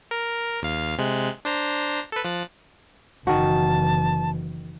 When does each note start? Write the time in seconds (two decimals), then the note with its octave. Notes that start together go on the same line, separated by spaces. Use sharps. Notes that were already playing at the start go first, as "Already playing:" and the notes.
0.11 A#4
0.62 D#2 F5
0.98 C3 G#3 F#6
1.45 D4 C5 A#5
2.12 A4 B4
2.25 F3 F#6 A6
3.27 F#1 D#3 E3 F#4 A5